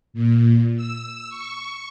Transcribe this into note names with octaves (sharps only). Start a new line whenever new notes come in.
A#2
E6
C#6